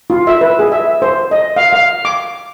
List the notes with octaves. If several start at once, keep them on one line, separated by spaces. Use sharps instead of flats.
F4
E5
B4
G#4
E5
C5
D#5
F5
F5
D6